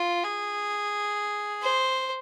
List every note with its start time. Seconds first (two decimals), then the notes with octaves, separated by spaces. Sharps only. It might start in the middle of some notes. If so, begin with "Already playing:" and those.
Already playing: F4
0.24 G#4
1.62 C5